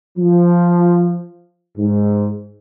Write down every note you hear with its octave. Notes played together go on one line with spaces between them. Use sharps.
F3
G#2